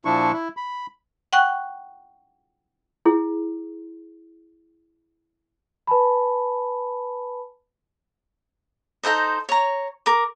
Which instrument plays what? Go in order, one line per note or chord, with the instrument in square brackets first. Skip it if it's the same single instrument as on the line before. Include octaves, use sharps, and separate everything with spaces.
[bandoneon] A#2 F3 D4 E4 C#6
E4
B5
[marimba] F#5 G5 C#6 F#6
[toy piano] E4 G#4
[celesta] B4 G#5 A5 B5
[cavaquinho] D#4 A4 C5 D#5
C#5 A#5
A#4 D6